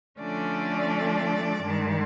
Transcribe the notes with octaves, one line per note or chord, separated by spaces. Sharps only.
D3 F3 A3 C#4 D4 D5
G2 D#3 G#3